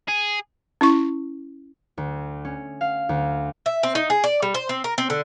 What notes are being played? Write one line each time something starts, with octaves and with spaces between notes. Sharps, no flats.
G#4
C#4 E4 C#6
D2
C#4
F5
D2
E5
C4
D#4
G#4
D5
G3
C5
C4
A#4
C4
D3